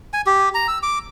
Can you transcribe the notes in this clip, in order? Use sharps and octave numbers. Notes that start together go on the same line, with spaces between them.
G#5
G4
A#5
E6
D6